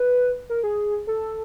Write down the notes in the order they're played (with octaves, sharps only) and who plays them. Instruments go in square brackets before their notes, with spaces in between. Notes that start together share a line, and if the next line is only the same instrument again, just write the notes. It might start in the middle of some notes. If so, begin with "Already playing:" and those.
Already playing: [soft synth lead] B4
A#4
G#4
A4